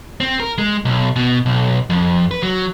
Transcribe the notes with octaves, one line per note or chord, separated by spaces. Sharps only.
C4
A#4
G#3
B1
B2
B1
F2
B4
F#3